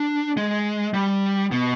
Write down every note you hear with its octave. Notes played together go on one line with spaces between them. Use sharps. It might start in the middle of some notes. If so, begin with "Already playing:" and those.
Already playing: D4
G#3
G3
B2